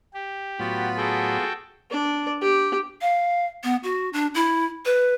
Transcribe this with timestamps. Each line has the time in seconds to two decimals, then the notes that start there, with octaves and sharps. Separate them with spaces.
0.14 G4
0.59 A2 F#3 B3 F4 F#4 B5
0.97 F#4 G#4 A4 G5
1.90 D4 D5
2.41 G4
3.01 F5
3.63 B3
3.83 F#4
4.13 D4
4.35 E4
4.85 B4